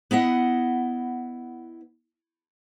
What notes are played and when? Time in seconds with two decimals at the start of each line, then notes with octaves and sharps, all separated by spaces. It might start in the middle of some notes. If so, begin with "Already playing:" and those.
0.11 B3 E4 D#5 F#5